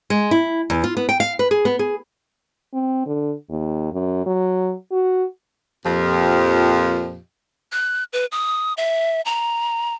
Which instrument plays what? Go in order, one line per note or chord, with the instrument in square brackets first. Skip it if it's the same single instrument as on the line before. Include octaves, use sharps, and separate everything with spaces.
[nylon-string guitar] G#3
E4
E2
F4
B3
G5
F5
B4
G#4
B3
G#4
[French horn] C4
D3
D#2
F#2
F#3
F#4
[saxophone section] F2 A#2 F3 G4
[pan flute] F#6
B4
D#6
E5
A#5